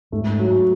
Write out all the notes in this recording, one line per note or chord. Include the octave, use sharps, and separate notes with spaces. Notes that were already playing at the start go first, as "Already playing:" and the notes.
G#2 A3
F#3